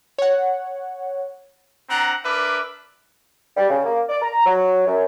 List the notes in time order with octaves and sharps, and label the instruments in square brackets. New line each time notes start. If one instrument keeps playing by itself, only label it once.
[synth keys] C#5 F#5
[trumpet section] C4 D4 F#5 A#5
D4 A#4 B4 E5 D6
[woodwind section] G3
C#3
A#3
D5
A#5
F#3
F#2